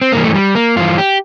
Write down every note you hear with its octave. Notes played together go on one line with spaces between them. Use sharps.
C4
G2 E3 A#3
A3
G3
A#3
G2 E3 F4
G4